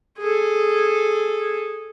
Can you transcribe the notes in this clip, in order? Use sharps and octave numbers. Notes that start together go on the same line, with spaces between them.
G#4 A4